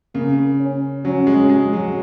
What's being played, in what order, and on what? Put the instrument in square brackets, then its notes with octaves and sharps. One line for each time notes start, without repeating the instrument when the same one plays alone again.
[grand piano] C#3 [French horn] A#3
[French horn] C#4
[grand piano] F#3 [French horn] C#4
[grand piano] G#3
G#3
F#3